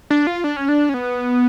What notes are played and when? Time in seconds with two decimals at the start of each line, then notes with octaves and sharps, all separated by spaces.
0.10 D4
0.27 F4
0.44 D4
0.57 C#4
0.69 D4
0.89 C#4
0.94 B3